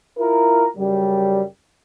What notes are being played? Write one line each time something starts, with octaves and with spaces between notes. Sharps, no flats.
E4 F4 A#4
F#2 C#3 G3